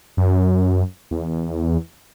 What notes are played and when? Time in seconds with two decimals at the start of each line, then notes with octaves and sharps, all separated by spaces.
0.17 F#2
1.11 E2